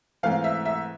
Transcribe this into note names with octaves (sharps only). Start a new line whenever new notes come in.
G#2 E3 A3 C4 F5
E5
E5